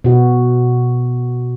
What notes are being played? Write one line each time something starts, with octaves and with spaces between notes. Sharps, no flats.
B2 F#4